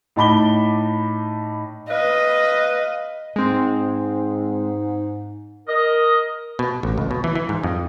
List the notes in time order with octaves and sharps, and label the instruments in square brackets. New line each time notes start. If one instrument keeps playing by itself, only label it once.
[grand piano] A2 D#4 A5 B5 D6 G7
[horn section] B4 [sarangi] D#5 [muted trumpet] F5
[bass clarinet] G#2 [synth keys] G#3 C4
[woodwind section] A#4 D#5
[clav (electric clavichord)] B2
A1
C#2
B2
E3
E3
G#2
F2